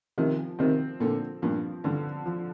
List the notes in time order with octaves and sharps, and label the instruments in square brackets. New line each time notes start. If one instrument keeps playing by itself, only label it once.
[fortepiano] C3 D#3 [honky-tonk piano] F3
[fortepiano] C3 D#3 [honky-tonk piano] C4
[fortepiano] A#2 D3 [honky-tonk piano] C4
[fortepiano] G2 A#2 [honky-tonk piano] F3
[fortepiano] G2 [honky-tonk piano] D3
[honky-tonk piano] F3